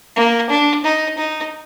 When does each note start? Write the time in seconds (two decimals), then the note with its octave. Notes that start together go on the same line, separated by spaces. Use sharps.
0.16 A#3
0.49 D4
0.84 D#4
1.18 D#4